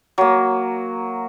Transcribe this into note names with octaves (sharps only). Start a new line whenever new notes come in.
F#3 A#3